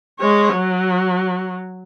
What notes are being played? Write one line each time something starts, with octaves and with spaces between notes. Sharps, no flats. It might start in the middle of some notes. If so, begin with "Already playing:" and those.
G#3 C#5
F#3